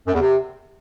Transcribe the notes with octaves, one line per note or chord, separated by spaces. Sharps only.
F#2
E2
C3